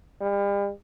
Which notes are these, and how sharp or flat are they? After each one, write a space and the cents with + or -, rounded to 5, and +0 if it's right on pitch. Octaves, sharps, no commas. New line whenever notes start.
G3 +40